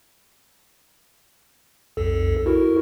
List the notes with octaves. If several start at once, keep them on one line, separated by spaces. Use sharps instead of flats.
B1 F2 A4
E4 F#4 A#4